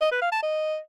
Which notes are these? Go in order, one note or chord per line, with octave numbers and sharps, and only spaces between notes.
D#5
B4
F5
A5
D#5